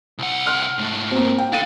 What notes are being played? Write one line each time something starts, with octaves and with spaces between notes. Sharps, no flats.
C2 F#5
C6 F6 F#6
G#2 A3
A#3 C4
G5
D4 A4 F5 A6 D#7